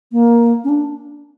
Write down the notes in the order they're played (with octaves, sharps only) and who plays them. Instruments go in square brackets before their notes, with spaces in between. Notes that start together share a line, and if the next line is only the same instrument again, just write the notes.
[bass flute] A#3
C#4
D4